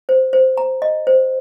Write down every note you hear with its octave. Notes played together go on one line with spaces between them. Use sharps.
C5
C5
A#5
D#5
C5